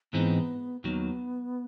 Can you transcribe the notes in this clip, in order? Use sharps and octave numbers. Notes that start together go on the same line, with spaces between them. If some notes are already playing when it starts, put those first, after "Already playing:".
G#2 E3 G#3 B3 C4 D#4
D#2 D#3 F#3 B3